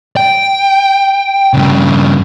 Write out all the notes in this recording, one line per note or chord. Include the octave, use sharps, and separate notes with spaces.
G5
G2 C#3